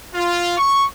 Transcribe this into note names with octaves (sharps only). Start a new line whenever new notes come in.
F4
C#6